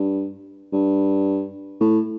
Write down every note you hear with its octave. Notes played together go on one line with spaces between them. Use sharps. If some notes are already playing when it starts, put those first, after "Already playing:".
Already playing: G2
G2
A2